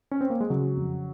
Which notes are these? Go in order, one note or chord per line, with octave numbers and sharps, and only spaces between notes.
C#4
C4
A#3
G#3
C#3 F#3
F2